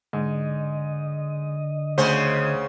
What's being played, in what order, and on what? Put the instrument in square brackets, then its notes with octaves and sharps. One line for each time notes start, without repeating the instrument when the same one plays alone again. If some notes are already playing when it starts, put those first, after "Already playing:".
[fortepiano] G#2 [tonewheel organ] D3 D#5
[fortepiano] D2 [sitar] C#3 C#4 C5